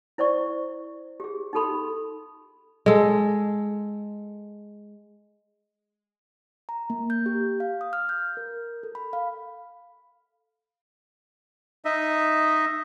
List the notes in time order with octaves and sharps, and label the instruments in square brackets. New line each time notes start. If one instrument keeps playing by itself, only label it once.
[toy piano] E4 C5 D5 C#6
G4 G#4
D#4 F4 G4 A4 B5 C6
[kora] G#3 A4
[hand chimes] A#5
A#3
G6
G4
F5
D#6
F6
G6
A#4
A4
B5
F5
[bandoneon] D#4 D#5 E5